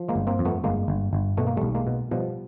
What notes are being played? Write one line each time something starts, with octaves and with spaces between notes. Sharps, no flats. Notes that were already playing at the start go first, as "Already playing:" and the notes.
Already playing: F3
G#3 A#3
G1
A#3 C4
F2
A3 B3
G1 G#3 A#3
G1
G1
B2 A3
A#3
B1 G3 A3
G#3 A#3
B2
B2 F3 G3